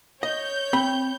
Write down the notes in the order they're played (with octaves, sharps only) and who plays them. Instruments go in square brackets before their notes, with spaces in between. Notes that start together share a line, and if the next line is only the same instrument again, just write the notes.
[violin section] C#5 G6 [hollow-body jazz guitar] D#5
[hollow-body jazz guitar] C4 B5